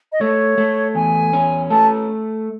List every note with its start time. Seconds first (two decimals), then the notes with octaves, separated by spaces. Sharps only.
0.12 D#5
0.21 A3 C#5
0.58 A3
0.95 E2 G#5
1.33 C#4
1.70 A3 A5